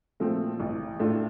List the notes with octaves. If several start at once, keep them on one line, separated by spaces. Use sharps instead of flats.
A#2 F3 A3 C4
A1
A2 A3 D4 F4